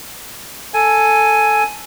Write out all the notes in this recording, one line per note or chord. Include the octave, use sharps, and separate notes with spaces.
A4 G#5